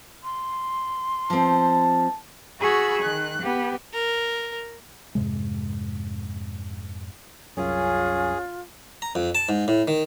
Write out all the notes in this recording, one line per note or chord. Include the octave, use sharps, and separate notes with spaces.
C6
F3 C4 A5
F#4 G#4 B5 C#6 E6
D#3 F#6
B3 G4
A#4
F2 G#2 C3 G#3
C2 F#2 C#4 F4 G#4
A#5
F2
A5
G#2
A2
D#3